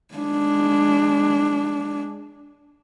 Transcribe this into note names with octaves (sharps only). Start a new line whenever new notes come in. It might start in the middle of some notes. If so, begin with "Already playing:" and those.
G#3 D4